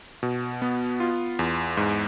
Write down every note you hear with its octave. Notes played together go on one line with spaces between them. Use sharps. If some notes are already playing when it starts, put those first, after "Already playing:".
B2
B3
F4
E2
G#2